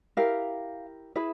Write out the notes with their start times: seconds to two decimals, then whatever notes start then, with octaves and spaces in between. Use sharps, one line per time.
0.17 E4 G4 A#4 F5
1.16 E4 G#4 B4 E5